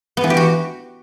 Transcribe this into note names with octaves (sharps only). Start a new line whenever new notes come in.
B3
E3
G4
F#4